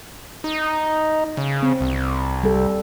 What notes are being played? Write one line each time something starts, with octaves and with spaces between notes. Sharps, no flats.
D#4
C#3
C4
C2
G3 A4